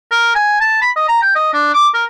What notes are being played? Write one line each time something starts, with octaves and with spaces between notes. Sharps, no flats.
A#4
G#5
A5
B5
D#5
A#5
G5
D#5
D4
D6
A#4